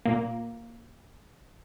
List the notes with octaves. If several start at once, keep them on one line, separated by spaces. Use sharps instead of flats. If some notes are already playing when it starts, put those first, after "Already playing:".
A#2 A#3